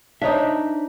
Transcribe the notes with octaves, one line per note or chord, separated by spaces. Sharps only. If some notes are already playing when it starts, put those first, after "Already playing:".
D4 D#4 C5 C#5 E5